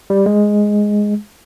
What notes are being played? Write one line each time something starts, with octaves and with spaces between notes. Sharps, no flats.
G3
G#3